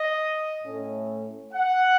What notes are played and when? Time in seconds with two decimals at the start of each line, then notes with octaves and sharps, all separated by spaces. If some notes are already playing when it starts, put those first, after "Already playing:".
Already playing: D#5
0.63 A2 A3 C#4
1.53 F#5